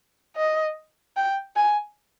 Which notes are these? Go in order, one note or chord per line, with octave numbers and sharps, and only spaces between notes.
D#5
G5
G#5